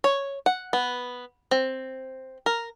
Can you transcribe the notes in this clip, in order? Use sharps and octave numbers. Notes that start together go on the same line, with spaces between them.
C#5
F#5
B3
C4
A#4